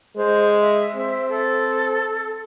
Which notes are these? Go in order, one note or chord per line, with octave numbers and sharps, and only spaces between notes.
G#3 C5
E5
C4
A4